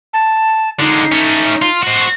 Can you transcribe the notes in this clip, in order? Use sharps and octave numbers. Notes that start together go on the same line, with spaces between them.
A5
D3 G#3 D#4
A3 C#4
F4
C4 F#4